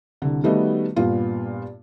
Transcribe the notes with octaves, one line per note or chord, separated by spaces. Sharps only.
C2 D3
D#3 G3 A3 B3 F#4 D#5
G2 A#2 B3 F4